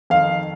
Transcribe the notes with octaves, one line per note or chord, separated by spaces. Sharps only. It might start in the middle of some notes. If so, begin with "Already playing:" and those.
F2 D#3 F5